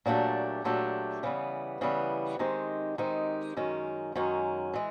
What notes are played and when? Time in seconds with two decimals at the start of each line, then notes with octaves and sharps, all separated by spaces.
0.06 A#2 F#3 A3 D4 G4
0.64 A#2 F#3 A3 D4 G4
1.23 C#3 E3 G3 B3
1.81 C#3 E3 G3 B3
2.39 D#3 G#3 C4 D#4 G4
2.98 D#3 G#3 C4 D#4 G4
3.57 F#2 D#3 G#3 C#4
4.16 F#2 D#3 G#3 C#4
4.74 E3 G#3